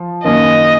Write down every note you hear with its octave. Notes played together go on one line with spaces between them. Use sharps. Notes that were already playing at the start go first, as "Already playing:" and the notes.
Already playing: F3
F#2 D#3 A#3 C#4 D#5